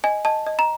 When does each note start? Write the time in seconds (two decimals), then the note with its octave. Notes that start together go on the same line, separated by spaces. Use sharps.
0.04 D#5 G#5
0.25 D#5 A5
0.46 D#5
0.59 A#5